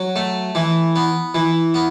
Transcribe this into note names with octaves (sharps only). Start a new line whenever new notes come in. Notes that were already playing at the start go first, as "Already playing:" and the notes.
Already playing: F#3
A3
E3
B3
E3
B3